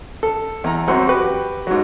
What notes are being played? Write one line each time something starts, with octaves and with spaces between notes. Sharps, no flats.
A4
E2 A#5
F#2 C4 F#5
F#4 G4 B4
G#2 F#3